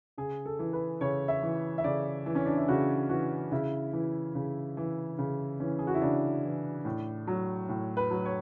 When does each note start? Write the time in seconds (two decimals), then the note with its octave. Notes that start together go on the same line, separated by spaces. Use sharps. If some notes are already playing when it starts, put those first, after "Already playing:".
0.18 C#3 G#4
0.46 A4
0.59 E3
0.73 B4
1.01 C#3 C#5
1.28 E5
1.43 E3
1.78 E5
1.84 C#3 D5
2.26 E3
2.35 C#4
2.46 D4
2.57 E4
2.68 C#3 F#4
3.09 E3 F#4
3.52 C#3 E4
3.93 E3
4.35 C#3
4.77 E3
5.18 C#3
5.60 E3 C#4
5.79 G#4
5.87 F#4
5.94 E4
6.02 C#3 D4
6.44 E3
6.85 A2
7.27 F#3
7.69 A2
7.97 B4
8.11 F#3
8.25 C#5